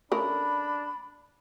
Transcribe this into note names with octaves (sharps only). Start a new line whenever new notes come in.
C#3 A3 D4 A#4 B5